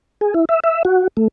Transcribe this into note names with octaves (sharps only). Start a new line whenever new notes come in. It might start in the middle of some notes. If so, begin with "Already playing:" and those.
G#4
E4
E5
E5
F#4
A3